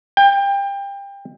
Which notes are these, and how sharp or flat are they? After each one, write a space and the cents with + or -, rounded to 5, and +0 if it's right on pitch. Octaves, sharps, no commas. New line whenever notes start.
G5 +25